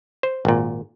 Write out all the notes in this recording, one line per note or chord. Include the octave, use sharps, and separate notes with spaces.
C5
G#1 A#2